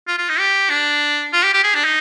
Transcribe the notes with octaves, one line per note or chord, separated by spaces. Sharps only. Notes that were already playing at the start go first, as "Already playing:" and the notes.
F4
F4
D#4
G4
D4
F4
G4
G4
G#4
D4
D#4